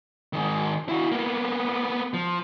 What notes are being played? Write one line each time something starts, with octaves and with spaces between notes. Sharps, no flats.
G#2 D#3
E4 F#4
A#3 B3
F3